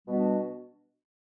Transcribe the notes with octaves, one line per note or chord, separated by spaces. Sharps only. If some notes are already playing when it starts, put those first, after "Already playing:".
B2 G3 B3 D4 F#4